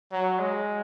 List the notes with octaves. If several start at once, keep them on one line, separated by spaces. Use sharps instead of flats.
F#3
G#3